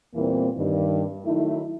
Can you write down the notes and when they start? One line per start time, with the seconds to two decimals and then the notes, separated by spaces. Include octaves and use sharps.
0.14 E2 A#2 E3 G3 A#3 C4
0.57 G2 D#3
1.25 D#3 F#3 A3 D#4 E4